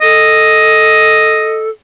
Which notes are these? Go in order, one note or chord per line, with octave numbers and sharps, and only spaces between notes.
A4 D#5